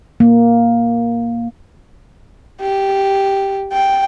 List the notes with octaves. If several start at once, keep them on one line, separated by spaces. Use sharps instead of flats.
A#3
G4
G5